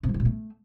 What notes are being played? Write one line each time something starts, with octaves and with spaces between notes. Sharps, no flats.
C3
F#3
C#3
B2
A3